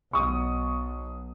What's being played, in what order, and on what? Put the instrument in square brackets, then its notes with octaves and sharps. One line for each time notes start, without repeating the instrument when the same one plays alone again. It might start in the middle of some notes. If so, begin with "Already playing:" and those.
[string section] B1 [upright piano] C#6 D#6